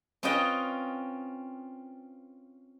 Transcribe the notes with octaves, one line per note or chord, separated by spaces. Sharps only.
C4 C#4 F4 B4 D#5 G5